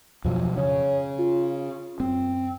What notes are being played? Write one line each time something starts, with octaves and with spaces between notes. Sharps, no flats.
F2 B2 F3 F#3
C#3 C#5
F4
F#2 C4